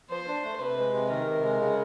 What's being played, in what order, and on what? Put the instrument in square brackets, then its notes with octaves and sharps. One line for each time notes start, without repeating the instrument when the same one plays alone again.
[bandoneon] F3 [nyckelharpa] C5
[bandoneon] D4
A3
[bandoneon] C3 [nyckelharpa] B4
[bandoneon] G#3
C3
[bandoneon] D#3 [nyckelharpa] A#4
[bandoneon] C3
G#3
C#3